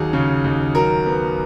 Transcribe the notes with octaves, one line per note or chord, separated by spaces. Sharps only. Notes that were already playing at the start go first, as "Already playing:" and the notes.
Already playing: D#2 F#3 G#4
C#3
D#2
F#3 A#4
B3